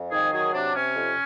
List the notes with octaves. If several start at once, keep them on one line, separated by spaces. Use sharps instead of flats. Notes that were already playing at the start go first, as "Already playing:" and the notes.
Already playing: F2
D#3 G#4
F#3 G#4
C3 D4
C3 C#4
F2